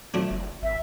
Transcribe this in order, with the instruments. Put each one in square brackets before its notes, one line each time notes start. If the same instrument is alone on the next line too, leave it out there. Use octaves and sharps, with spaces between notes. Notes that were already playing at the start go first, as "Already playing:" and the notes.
[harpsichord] F2 F#3 D4 [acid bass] A3
[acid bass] F#1
[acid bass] G#1 [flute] E5